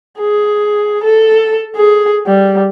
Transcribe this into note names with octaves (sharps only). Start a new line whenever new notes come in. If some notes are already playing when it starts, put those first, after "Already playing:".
G#4
A4
G#4
G3